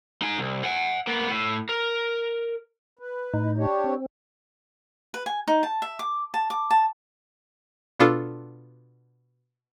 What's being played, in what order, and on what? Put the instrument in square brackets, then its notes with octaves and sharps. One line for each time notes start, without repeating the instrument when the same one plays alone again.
[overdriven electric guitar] D#4 G#5
C2
F#5 G#5
A#3 B3
A2
A#4
[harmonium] B4
[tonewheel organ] A2 D#4
[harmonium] D4 G4 C#5
[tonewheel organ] C4
[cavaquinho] B4
G#5
D#4
A5
E5
D6
A5
D6
A5
[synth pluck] B2 B3 D4 F4 A4